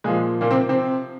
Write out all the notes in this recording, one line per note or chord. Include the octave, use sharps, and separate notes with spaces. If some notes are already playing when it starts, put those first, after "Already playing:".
A#2 F3 G#3
A#2 A#3
C3 C4
C3 C4